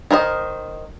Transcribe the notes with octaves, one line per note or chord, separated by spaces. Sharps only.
D#3 A#4 C5 D#5